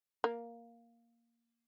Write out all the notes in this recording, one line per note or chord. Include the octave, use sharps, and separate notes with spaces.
A#3